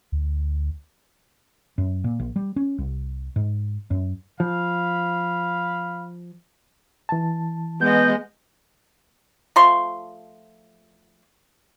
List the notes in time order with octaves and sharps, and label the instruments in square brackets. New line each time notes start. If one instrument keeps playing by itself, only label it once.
[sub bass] D2
[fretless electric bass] F#2
A#2
A#1
G3
C#4
C2
G#2
F#2
[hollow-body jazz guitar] F3 [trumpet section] F5 B5
[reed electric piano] E3 A5
[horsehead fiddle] G#3 D#5 [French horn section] B3 [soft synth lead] G6
[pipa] F3 A3 C6 C#6